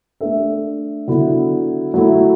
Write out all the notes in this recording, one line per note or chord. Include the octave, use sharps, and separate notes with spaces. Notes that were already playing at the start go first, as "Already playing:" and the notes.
A3 D4 A4 E5
D3 F#3 B3 E4
F#3 A3 E4